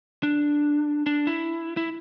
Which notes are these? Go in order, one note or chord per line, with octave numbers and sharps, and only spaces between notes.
D4
D4
E4
E4